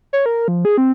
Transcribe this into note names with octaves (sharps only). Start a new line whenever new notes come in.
C#5
A#4
F3
G#4
C4